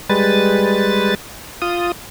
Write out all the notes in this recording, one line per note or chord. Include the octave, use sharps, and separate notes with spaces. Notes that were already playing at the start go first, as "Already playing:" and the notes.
G3 G#3 B4 A6
F4 D#6